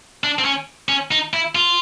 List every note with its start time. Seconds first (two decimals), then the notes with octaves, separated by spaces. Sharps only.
0.24 D4
0.39 C4
0.45 C#4
0.89 C#4
1.11 D#4
1.34 E4
1.55 F4